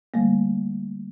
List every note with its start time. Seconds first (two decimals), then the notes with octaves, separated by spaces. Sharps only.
0.14 D3 G3 A3 A#3